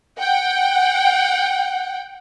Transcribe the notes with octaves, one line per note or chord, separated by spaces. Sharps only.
F#5 G5